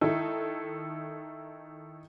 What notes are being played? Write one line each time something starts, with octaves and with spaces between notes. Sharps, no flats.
D#3 D#4 E4 A4